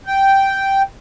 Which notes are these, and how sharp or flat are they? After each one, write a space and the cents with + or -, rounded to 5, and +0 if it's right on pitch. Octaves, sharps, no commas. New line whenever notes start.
G5 -5